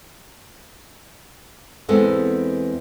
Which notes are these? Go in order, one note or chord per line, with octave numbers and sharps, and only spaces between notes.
E2 G#3 B3 C4 A4 F#5